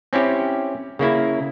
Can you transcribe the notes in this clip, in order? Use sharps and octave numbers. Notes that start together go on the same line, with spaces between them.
C4 C#4 E4 G4
C#3 A#3 E4